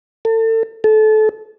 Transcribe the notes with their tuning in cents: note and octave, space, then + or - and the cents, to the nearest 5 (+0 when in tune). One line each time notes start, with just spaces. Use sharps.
A4 +35
A4 -25